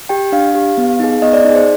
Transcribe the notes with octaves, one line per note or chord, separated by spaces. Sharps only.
G4 G5
D4 F5
G4
B3
D#4 G#4
B3 D#5
D5
D#4 G#4
C5